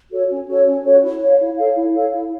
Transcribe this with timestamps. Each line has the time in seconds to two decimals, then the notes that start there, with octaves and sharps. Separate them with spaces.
0.11 F#4 A4 C#5
0.29 C#4
0.48 F#4 A4 C#5
0.66 C#4
0.84 F#4 A4 C#5
1.02 E4
1.21 A4 C#5 F5
1.39 E4
1.57 A4 C#5 F5
1.75 E4
1.94 A4 C#5 F5
2.13 E4